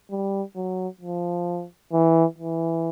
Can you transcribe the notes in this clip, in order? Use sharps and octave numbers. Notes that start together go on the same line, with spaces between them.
G3
F#3
F3
E3
E3